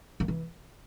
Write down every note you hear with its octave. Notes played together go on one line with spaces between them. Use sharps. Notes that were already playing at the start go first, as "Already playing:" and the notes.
D#3
E3